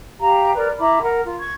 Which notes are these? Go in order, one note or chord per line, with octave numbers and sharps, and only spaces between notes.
G4 F5 A#5
A#4 B4 D5
E4 A#5 B5 D6
A#4 F#5
F4
C#6 G#6